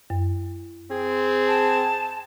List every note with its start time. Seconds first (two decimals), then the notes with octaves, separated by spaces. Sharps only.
0.10 F#2
0.90 C4 G#4
1.47 A5